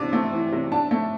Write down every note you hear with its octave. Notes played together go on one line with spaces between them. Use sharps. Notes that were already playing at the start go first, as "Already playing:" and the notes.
Already playing: C3 E3 D4 D6
A3
E3
C3
D4 A5
A3